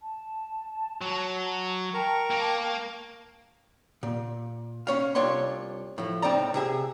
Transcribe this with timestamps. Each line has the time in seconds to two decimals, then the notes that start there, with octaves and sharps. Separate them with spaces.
0.01 A5
1.01 F#3
1.94 A#4 G5 A5 A#5 C#6
2.30 A#3
4.03 A#2
4.87 C#4 C#5 F5
5.15 C2 D4 F4 C#5 C6
5.98 A2 F3
6.22 C#2 A2 C4 D#4 D5 A#5
6.54 C3 G#4 E5